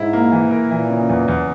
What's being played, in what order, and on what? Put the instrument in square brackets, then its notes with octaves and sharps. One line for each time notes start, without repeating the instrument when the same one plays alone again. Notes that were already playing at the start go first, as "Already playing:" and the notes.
Already playing: [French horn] G#2 [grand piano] E4
[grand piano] A#3
E3
A#4
[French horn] A#2 [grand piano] E3
[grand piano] C#3
E2
E2